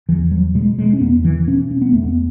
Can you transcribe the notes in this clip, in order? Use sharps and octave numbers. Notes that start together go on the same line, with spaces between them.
E2 E3
F#3
B2 G#3
G#3
C#4
E2 B3
E3
B2 C#4
C#4
B3
E2 A3
B3